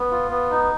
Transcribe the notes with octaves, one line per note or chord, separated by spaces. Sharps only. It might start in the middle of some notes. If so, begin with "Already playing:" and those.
Already playing: B3
F4
B3
D#4